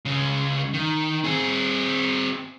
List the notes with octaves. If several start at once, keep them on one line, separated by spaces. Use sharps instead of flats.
C#2 C#3
D#3
C4 G#4